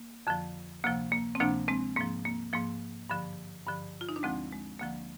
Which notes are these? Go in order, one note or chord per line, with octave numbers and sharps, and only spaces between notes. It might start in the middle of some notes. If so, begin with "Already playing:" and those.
Already playing: A#3
F2 D3 F3
D2 C3 F3 A#3
A#3
C4
D2 C3 F3 A#3 D4
G#3 C4
G#2 F3 A#3
A#3
G#2 F3 A#3
G2 D3 F3
G2 D3 F3
F4
D#4
D4
D2 D3 F3 G#3 C4
G#3
D2 D3 F3 A#3